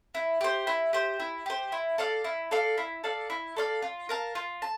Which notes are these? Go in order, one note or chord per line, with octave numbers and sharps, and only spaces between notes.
E4
G4 C5
E4
G4 C5
E4
G4 C5
E4
A4 D5 F5
E4
A4 D5 F5
E4
A4 D5 F5
E4
A4 D5 F5
F4
A#4 F5 A5
F4
A5